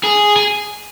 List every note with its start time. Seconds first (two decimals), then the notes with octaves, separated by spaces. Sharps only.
0.04 G#4
0.36 G#4